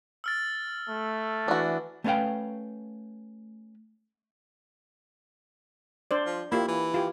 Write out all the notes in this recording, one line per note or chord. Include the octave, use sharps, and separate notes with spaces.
E6 F6 A6
A3
E3 D4 F#4
A3 B3 C#4 B4 F5 G5
D4 C5 D5
F3
A#3 E4 F4 G4
E3
F4 G4